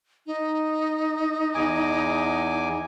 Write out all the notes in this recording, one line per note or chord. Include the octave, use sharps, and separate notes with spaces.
D#4
E2 G#5 D6